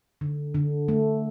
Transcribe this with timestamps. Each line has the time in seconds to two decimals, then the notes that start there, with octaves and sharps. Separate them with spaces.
0.21 D3
0.54 D3
0.88 A3